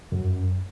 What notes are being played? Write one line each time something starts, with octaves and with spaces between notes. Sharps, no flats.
F#2